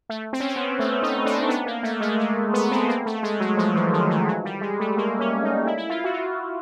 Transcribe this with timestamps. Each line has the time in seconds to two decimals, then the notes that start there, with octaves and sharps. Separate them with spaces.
0.09 A3
0.33 C4
0.40 C#4
0.48 C4
0.56 B3
0.79 A3
1.03 D#4
1.26 D4
1.49 B3
1.66 A#3
1.83 A3
2.01 G#3
2.19 A3
2.53 B3
2.71 C4
2.88 A#3
3.06 A3
3.23 G#3
3.40 F#3
3.57 F3
3.75 E3
3.92 D#3
4.10 E3
4.27 F#3
4.45 G3
4.61 G#3
4.80 A3
4.97 A#3
5.19 C#4
5.43 D#4
5.66 E4
5.78 E4
5.89 F4
6.04 F#4
6.13 F4